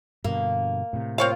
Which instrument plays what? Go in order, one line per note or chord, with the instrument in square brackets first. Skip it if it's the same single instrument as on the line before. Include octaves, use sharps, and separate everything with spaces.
[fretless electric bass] G2 B2 D3 [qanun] A#3
[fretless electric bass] A2 C3
[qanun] A#3 F4 [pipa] C4 C#5 F5